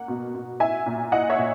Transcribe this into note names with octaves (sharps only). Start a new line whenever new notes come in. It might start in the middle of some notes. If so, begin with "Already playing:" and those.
Already playing: A#3 F#5
B2
B2
E4 E5 G#5
A#2
E4 D#5 F#5
C#5 E5
A#2